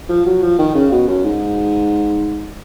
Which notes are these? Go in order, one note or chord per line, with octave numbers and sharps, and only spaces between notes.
F3
F#3
F3
D#3
C#3
B2
F#2
G#2